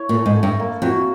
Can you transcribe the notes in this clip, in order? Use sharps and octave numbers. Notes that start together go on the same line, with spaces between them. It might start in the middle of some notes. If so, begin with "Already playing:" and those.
Already playing: E4 C#5
A#2
A4
G#2
A4
G2
A#3
F2 F#4